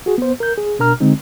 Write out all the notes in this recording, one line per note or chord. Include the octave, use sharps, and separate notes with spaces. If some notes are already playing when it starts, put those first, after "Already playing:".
F#4 G#4
B3 C5
A#4 G6
G#4
B2 D4 A#4 A#5 F6
D3 G#3 C4 D#4